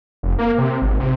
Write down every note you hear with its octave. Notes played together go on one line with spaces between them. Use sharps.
F1
A#3
C3
G#1
C3